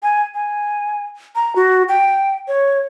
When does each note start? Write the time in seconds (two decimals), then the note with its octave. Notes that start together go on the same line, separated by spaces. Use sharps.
0.03 G#5
0.34 G#5
1.35 A#5
1.56 F#4
1.89 G5
2.48 C#5